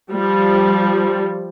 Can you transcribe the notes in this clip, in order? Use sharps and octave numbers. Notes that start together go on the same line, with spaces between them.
F3 G3